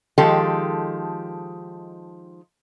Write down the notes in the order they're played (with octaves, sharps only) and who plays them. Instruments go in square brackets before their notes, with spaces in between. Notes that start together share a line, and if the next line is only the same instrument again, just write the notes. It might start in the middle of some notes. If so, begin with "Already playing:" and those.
[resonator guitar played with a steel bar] D#3 F3 G#3 G4 A4